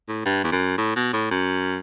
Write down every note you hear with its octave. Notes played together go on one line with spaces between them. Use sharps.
A2
G2
E2
F#2
A2
B2
A2
F#2